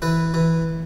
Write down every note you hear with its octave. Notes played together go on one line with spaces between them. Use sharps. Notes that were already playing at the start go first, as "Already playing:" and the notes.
E3 B4
E3